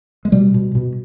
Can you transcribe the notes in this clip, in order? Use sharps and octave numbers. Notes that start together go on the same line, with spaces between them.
G#3
B2 G3
B2
B2